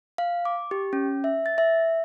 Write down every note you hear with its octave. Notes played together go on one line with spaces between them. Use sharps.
F5
D6
G4
C#4
E5
A6
E5